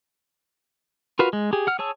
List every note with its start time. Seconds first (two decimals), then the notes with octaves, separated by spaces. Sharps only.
1.19 F4 F#4 A#4 B4 F5
1.33 G#3
1.53 G4 G#4
1.67 F#5 F6
1.79 G#4 C#5 A5 E6